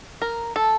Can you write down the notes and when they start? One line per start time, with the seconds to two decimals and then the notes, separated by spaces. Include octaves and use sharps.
0.22 A#4
0.56 A4